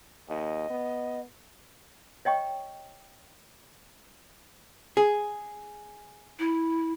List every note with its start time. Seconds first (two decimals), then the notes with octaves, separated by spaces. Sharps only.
0.29 D#2 D#5
0.70 B3
2.25 C#5 D#5 G5 C#6
4.97 G#4
6.39 E4